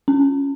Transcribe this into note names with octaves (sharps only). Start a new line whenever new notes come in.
C#4